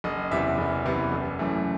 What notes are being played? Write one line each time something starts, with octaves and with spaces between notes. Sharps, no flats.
F#1 D#5
E2 C3 E3 B3 E5
F#1
E2 C3 E3 B3
F#1
F#2 E3 A3